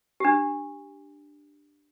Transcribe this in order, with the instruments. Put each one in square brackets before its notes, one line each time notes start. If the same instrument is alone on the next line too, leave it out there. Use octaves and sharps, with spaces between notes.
[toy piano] D4 G4